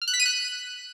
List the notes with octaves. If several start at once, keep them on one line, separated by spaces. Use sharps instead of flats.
F6
F#6
B6
D#7
F#6